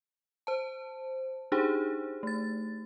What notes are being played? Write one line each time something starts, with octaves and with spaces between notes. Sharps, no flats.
C5 A5
D4 D#4 G4 G#4 C5
A3 A6